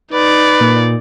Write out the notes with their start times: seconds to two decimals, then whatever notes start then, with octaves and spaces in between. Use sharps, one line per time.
0.13 D#4 B4 D5
0.60 A#2